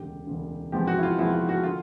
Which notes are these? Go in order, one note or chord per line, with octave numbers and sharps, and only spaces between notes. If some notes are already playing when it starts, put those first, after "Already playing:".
Already playing: E1 D2 C#3 G4
E1 D2 C#3
E2 C3 F3 G#3 G4
F#4
E4
F4
E2 C3 F3 G#3 E4
F4
F#4
D3 F4